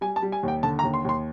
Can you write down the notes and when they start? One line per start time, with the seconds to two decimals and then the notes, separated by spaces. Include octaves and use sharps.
0.01 G3 G#5
0.16 A5
0.22 G3
0.32 G#5
0.43 D#2 G5
0.63 D3 A5
0.79 A#5
0.84 D#2
0.94 C6
1.05 D#2 C6